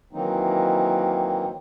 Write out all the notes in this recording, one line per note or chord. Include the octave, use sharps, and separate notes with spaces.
D#3 E3 F#3 A#3 C4 D#4